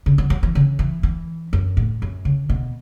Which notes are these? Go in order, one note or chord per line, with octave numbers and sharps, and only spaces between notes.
C#3
F#3
F#3
E3
C#3
E3
E3
F#2
A2
F#2
C#3
B2